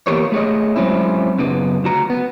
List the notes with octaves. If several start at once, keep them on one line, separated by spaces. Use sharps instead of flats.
E3 A#3 B3 G4 A#4 C#5
A3 G#4 C#5 D#5
F#3 G#3 C4 C#4 E4
F#2 C#3 B3
D2 F#4 A#5
B3